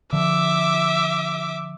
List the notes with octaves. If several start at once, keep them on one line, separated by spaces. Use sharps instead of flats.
D3 F3 E5 D6